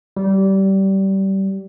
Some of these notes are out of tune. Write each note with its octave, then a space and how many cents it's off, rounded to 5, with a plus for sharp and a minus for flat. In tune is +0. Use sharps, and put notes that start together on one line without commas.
G3 -20